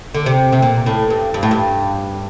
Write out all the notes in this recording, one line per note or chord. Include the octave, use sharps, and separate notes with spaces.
D3
C3
C3
A#2
A2
G2
G2
A2
G2